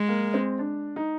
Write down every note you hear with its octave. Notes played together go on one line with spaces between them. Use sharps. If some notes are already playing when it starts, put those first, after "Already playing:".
Already playing: G#3
A#3
C4
D4
D#4